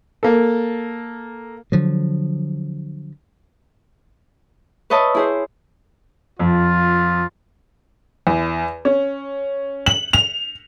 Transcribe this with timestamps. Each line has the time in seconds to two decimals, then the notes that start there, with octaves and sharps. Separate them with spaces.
0.23 A#3 A4
1.72 D3 F3 F#3
4.90 B4 C#5 D#5 E5 A5
5.15 E4 G#4 C5
6.39 F2 F4
8.27 E2
8.85 C#4
9.86 F#7
10.13 F7